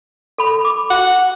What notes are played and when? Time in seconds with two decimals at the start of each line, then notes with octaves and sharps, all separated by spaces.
0.38 A4 B5
0.65 D6
0.90 F#5